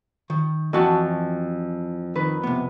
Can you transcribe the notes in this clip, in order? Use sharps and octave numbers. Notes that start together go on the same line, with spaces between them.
D#3
F2 E3 F#4 A5
D#3 B4
C3 B3